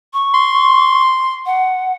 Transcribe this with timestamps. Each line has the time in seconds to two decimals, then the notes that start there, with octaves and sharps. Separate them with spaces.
0.14 C#6
0.34 C6
1.46 F#5